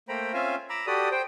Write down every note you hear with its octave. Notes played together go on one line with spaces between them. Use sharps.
A3 A#3 C5 G5 A#5 B5
C4 C#4 F4 E5 F5 G#5
A#5 B5 D6 E6
F#4 G4 A4 D5 B5 D#6
C5 G5